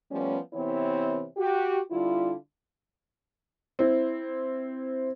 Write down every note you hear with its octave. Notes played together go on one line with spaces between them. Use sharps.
F3 G3 A3 B3 C#4
C3 E3 B3 C4 E4 C#5
F#4 G4
D3 G3 E4 F4
C4 E4